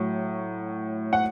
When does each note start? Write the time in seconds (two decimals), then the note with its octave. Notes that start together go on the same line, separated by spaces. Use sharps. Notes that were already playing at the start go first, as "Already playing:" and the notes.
Already playing: A2 F#3
1.13 F#5